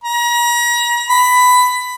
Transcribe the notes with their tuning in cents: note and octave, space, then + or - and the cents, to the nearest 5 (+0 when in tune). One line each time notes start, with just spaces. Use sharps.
A#5 +40
B5 +15